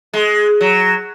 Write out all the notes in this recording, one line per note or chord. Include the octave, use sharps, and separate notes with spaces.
G#3
F#3